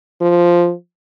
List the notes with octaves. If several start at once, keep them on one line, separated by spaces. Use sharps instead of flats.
F3